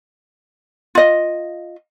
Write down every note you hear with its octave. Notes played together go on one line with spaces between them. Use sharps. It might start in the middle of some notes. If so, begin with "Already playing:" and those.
F4 D#5